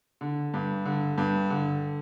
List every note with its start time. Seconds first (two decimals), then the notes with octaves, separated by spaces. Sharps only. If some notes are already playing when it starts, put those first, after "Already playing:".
0.21 D3
0.54 G2
0.85 D3
1.18 G2
1.50 D3